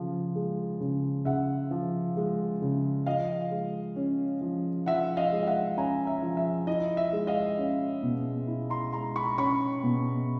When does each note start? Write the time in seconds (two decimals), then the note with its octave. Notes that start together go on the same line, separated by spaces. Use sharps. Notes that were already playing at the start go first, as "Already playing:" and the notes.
Already playing: C#3 F3
0.36 G#3
0.81 C#3
1.25 C#3 E5 F#5
1.71 F3
2.17 G#3
2.62 C#3
3.06 F3 D#5 F5
3.51 G#3
3.96 C#4
4.41 F3
4.86 F3 E5 F#5
5.17 D#5 F5
5.32 G#3
5.43 F5
5.47 E5 F#5
5.77 C#4 G#5 A#5
6.07 E5
6.22 F3
6.37 E5
6.67 E4 D#5
6.97 E5
7.13 G#3
7.27 D#5 F5
7.58 C#4
8.03 B2
8.47 E4
8.70 A#5 C6
8.93 G#3 A#5 C6
9.16 B5 C#6
9.38 C#4 B5 C#6
9.83 B2